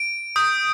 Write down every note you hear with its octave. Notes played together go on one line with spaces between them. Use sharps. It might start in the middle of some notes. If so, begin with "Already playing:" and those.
Already playing: D7
D#6 G6